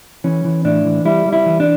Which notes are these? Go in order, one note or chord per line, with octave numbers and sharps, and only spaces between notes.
E3 C#4
E3
A2 D4
E3
G3 E4
G3
E4
E3
D4